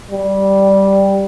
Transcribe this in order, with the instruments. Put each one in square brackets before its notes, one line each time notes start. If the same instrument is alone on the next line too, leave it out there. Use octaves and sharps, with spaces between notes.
[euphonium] G3